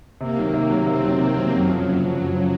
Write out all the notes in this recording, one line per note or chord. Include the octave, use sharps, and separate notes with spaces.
C3 A#3
D#3 F#3
C3
D#3 F#3
C3 C4
D#3 F#3
C3 A#3
D#3 F#3
F#2 F#3
C#3 F3
F#2 F#3
C#3 F3
F#2
C#3 F3